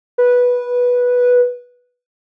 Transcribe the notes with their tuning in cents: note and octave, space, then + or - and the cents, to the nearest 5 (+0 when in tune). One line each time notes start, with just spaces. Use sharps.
B4 -10